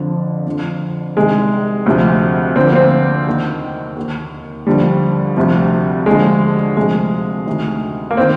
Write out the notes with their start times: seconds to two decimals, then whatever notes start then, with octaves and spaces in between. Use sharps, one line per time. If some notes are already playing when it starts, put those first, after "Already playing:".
Already playing: F2 D3 F3
0.47 F2 D3 F3
1.16 C2 C3 D#3 G#3
1.86 D2 C3 F3
2.56 D2 D3 F3 C4
2.66 A#3
2.75 C4
3.27 D#2 D#3
3.96 D#2 D#3
4.67 D#2 D3 F3 G3
5.37 D2 C3 F3
6.06 D#2 D3 F3 G#3
6.77 D2 C3 F3 G#3
7.47 D2 C3 D#3
8.11 A#3
8.17 D#3 C4